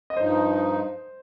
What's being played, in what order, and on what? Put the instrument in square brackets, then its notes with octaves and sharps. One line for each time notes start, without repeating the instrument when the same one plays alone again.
[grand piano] D#5
[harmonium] G2 F3 D#4 [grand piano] C5